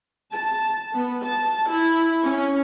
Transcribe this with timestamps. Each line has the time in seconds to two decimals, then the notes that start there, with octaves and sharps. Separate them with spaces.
0.31 A5
0.93 B3
1.26 A5
1.72 E4
2.24 C#4